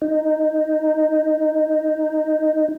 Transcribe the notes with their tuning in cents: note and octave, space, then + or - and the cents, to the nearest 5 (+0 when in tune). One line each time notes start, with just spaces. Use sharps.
D#4 -5